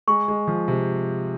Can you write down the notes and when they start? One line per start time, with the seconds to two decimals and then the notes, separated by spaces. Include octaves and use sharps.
0.08 G#3 C#6
0.28 G#3
0.47 F3
0.68 C3